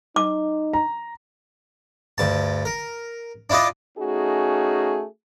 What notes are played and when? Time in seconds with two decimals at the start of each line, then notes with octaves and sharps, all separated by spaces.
0.16 D#4 D6
0.73 A#5
2.18 D2 G2 A5
2.65 A#4
3.50 D4 E4 F4 D5 D#5
3.98 A3 C#4 D#4 F#4 G#4